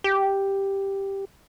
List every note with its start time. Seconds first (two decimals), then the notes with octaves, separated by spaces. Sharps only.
0.04 G4